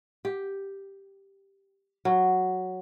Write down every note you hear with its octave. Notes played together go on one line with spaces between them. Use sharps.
G4
F#3